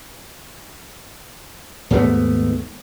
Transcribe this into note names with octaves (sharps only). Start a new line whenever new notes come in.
D#2 G#2 A3 B3